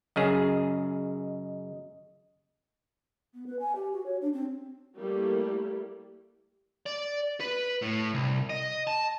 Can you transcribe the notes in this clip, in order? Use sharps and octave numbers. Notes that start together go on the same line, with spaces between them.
F#2 C#3 G#4 D#5
B3
B4
G#5
G4
F#4
C#5
D4
C4
G3 A3 A#3 E4
D5
B4
A2
C2
D#5
A5